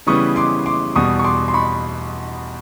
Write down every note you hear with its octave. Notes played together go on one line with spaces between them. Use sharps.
C#3 E3 G3 B3 C#6 D#6
C6 D6
C6 D6
E2 B2 G3 C#6 D#6
C#6
C6 D6
C6
B5 C#6